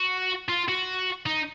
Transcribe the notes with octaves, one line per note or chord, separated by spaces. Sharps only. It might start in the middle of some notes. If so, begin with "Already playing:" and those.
Already playing: F#4
F4
F#4
D#4